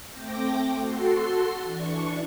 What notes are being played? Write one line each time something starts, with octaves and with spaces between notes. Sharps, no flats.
A3 C4 G5 D6 A#6
F#4 A4 C6 C7
E3 D4 C#6